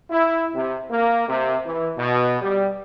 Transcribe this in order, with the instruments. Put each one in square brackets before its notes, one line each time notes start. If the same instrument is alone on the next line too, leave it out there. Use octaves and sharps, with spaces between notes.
[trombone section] E4
C3
A#3
C3
E3
B2
G3